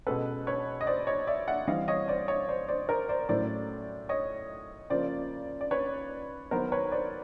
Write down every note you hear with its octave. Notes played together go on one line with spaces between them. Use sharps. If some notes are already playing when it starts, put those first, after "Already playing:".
B2 G#3 C#4 A4 B4
B4 C#5
D#5
C5 D5
C#5 D#5
D5 E5
E5 F#5
E3 G3 C4 D#5 F5
C#5 D#5
C5 D5
C#5 D#5
C5 D5
C5 D5
A#4 C5
C5 D5
A2 F#3 A3 C#4 C5 D5
C#5 D#5
C#3 F3 A#3 C5 D5
D5
B4 C#5
D#3 F#3 B3 A#4 C5
B4 C#5
C5 D5